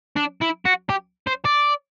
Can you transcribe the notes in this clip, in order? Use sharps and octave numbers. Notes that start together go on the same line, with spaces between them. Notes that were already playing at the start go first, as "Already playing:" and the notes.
D4
E4
F#4
G4
C5
D5